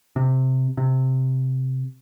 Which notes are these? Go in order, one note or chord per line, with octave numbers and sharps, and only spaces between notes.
C3
C3